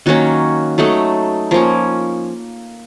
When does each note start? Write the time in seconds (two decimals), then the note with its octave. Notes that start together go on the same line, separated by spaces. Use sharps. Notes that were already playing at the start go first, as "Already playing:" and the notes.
0.06 D#3 F#3 A#3 C#4 F#4
0.78 F#3 A3 D#4 A4
1.51 F3 A#3 C#4 A#4